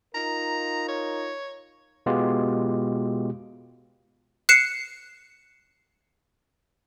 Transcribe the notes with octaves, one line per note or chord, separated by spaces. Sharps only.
D#4 F4 A#4 A#5
C#5
B2 G#3 B3 F4 G4
F#6 C7 C#7 E7